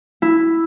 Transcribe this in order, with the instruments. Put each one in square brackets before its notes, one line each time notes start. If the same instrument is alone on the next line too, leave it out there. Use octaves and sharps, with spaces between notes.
[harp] E4